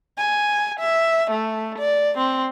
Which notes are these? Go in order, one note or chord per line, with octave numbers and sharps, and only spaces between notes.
G#5
E5
A3
D5
C4